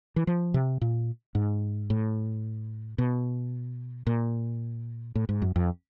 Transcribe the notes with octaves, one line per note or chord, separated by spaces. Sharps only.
E3
F3
C3
A#2
G#2
A2
B2
A#2
A2
G#2
F#2
F2